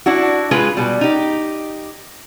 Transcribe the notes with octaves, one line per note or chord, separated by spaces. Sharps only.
D4 E4 F#4
G#3 F4 G#4 B4
B2 G3
D#4 G4